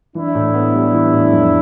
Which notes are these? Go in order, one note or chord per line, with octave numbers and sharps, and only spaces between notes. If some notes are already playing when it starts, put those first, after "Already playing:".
E3 D4 E4
A2
B3
G3
E3
A2
F2